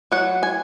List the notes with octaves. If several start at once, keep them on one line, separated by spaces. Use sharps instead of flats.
F#3 F#5
G#5